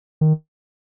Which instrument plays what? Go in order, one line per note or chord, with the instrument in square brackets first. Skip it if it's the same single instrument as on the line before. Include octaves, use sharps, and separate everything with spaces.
[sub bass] D#3